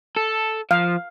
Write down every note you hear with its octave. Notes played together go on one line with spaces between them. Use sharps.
A4
F3 F5